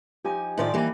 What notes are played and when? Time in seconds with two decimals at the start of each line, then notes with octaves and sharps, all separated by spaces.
0.24 F3 D#4 G4 G#5
0.57 A2 D#3 F4 C5 D5 E5
0.74 E3 A#3 G4 B5